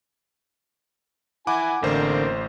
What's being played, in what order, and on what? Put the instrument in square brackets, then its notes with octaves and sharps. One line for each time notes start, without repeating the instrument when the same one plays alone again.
[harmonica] E4 G#5 [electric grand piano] F#5 D6
[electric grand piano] A1 C5 [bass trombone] D3 [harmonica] A#3 C4